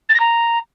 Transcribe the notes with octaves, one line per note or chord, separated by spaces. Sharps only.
A6
A#6
A#5